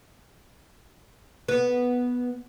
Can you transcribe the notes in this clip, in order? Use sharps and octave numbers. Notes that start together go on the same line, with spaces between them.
B3